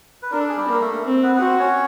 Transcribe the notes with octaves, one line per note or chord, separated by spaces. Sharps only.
B4
D4 A#4
A4
G#4
G3 G4
A#3 A#4
A3 A4
C4
B3 B4
B4
C4 F#4 C5
C#4 C#5